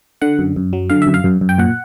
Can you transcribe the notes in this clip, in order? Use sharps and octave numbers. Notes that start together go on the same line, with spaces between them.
D3 F#5
F#2
F#2
F#3
D3 F5
F#2 E5
F5
F#2
F#2
G5
A#2 F#5